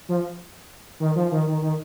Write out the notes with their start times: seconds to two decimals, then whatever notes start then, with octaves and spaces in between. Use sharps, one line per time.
0.09 F3
1.00 D#3
1.16 F3
1.32 D#3
1.47 D#3
1.62 D#3